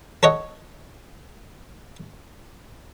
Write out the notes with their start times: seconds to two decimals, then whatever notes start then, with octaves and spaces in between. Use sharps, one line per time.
0.23 A4 C#5 D#5 F#5